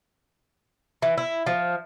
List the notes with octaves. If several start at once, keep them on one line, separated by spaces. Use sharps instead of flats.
E3
E4
F3